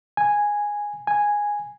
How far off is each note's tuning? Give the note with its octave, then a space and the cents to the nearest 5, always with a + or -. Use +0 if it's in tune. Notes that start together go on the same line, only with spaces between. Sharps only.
G#5 -5
G#5 -5